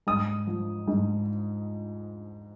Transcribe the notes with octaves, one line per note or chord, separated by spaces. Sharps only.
G#2 D#6
F3
G#2